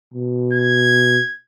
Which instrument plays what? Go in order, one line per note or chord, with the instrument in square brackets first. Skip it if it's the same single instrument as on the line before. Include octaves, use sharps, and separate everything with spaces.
[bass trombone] B2
[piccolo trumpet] G#6